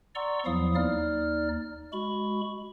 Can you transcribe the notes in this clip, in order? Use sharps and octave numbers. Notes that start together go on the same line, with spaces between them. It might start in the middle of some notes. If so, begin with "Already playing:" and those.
D5 F#5 A#5 C6 C#6 E6
E2 F3 F#3 E4 F5 D#6
D#2 D#4 D5 F6
G#3 F#4 B5 C#6